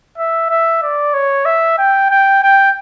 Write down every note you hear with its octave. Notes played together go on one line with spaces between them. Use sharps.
E5
E5
D5
C#5
E5
G5
G5
G5